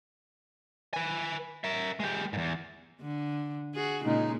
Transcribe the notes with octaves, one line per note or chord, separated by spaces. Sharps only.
B4 G#5
A#4 E5
G#3 G4
E2 G#2
D3
F#4 G#4
A#2 C#3 G#3 D#4